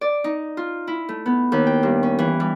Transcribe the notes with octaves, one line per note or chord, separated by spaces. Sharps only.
D5
D#4
F4
E4
A3
B3
D#2
G5
G2
C#4
E3
G3